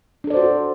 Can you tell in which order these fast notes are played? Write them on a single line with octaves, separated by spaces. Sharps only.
D4 A4 D5 C5 F#4